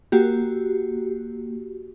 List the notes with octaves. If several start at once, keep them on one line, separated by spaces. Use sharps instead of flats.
A#3 F#4 G4